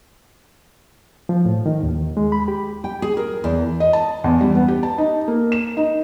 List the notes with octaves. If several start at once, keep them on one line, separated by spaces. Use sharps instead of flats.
F3
A2
D#3
D#2
G#3
B5
G4
G5
G#4
A#4
E2
D#5
A5
E2
G3
B3
G4
A5
D#4
A#3
E7
D#4